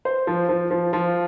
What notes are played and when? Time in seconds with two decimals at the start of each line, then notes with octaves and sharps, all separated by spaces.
0.05 C5
0.27 F3
0.49 F3
0.71 F3
0.93 F3